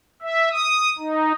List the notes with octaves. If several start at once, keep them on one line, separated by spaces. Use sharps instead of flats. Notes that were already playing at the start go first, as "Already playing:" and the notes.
E5
D#6
D#4